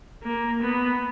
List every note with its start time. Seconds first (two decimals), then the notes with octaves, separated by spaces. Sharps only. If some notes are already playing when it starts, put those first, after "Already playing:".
0.23 A#3
0.62 B3